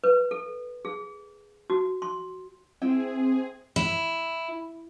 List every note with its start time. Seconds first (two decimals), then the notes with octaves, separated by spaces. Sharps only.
0.04 B4
0.31 A4
0.85 G#4
1.70 F#4
2.02 C6
2.82 C4 E4 G#4 G5
3.76 E4